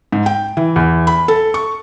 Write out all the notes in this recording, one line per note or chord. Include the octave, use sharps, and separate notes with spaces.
G#2
G5
E3
E2
B5
A4
C#6